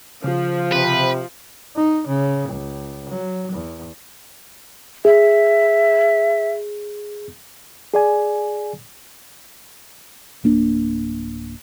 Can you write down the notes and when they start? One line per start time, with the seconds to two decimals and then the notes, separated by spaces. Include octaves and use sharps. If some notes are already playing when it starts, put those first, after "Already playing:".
0.24 C#3 F3
0.72 C3 B4
1.76 D#4
2.07 C#3
2.49 C#2
3.09 F#3
3.52 E2
5.05 G#4 E5
7.94 G#4 D5 G#5
10.44 D1 A#3 D4